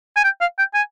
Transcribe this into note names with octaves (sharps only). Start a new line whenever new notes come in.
G#5
G5
F5
G5
G#5